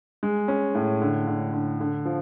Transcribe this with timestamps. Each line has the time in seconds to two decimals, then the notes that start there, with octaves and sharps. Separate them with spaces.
0.23 G#3
0.48 C#4
0.75 A2
1.01 D3
1.27 D3
1.53 D3
1.80 D3
2.05 F3